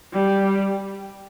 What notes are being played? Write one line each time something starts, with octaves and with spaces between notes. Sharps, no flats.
G3